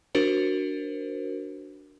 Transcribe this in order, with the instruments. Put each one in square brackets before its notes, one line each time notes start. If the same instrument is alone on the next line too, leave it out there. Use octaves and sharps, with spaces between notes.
[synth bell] D4 F#4 A#4 C5